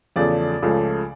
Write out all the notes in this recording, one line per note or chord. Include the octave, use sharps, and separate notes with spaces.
E2 C#3 F3 A3 D5
C#2 C#3 F3 A3